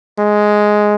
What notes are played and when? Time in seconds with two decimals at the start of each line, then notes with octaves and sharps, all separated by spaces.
0.19 G#3